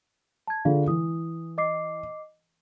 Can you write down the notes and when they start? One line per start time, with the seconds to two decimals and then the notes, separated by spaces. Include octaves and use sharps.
0.47 A5 G#6
0.65 D3 F4 G#4 F5
0.88 E3 D#6
1.58 D#5 D6 C7